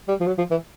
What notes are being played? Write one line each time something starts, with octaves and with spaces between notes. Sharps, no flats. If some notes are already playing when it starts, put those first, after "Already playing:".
G3
F3
F#3
F3
E3